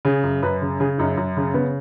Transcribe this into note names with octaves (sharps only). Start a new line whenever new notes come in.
C#3 G#4
F#2
F#2 B4
C#3
C#3 G#4
F#2 D#4
F#2
C#3
C#3 B3